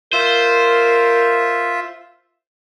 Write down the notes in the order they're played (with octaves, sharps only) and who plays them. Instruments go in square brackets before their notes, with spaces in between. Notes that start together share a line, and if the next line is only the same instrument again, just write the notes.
[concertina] F4 E5 [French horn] A#4 [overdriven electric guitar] C5